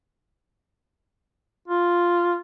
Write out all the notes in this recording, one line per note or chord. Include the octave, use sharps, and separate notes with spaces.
F4